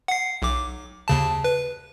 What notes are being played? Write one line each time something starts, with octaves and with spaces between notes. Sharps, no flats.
F#5 C7
B1 D6
D#2 C#3 A5
B4